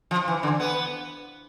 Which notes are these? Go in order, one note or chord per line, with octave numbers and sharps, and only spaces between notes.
F3
E3
D3
B3